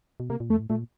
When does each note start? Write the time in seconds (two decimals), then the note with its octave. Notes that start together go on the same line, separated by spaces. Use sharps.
0.20 B2
0.30 C3 A#3
0.40 A#2
0.50 F2 A3
0.60 A2
0.69 A#2 A3